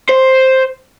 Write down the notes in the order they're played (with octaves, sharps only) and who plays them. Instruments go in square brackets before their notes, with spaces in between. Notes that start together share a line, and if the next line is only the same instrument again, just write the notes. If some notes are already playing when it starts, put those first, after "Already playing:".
[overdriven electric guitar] C5